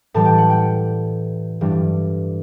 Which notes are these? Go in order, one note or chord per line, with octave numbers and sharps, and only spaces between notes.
A2 E3 G3 A5
G5
F#5
G5
G2 E3 G3